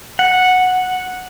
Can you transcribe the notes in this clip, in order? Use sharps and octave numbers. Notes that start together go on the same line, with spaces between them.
F#5